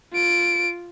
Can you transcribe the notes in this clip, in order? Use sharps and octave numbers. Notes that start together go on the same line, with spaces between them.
F4 D7